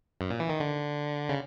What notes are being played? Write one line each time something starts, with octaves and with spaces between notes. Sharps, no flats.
F#2
A#2
E3
D#3
D3
C#3